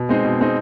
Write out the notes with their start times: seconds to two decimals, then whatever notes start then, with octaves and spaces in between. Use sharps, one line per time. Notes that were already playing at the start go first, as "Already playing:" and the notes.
Already playing: B2
0.09 G#3 C4 D#4
0.24 B2
0.40 G#3 C4 D#4